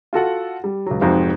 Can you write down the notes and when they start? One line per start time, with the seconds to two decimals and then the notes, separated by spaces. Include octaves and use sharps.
0.13 F4 F#4 A4 F#5
0.64 G3
0.86 C#2 F#3
1.01 F1 F2 G#2 F#4 C5 F5